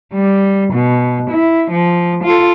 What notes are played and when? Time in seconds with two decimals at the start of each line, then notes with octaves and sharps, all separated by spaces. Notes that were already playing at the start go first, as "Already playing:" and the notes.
0.14 G3
0.73 B2
1.30 E4
1.71 F3
2.24 F4 A4